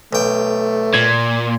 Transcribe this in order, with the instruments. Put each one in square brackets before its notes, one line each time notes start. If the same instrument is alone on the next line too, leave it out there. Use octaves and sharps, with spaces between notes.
[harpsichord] B1 G5 [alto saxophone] A3
[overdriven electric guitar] A#2 [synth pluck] G#6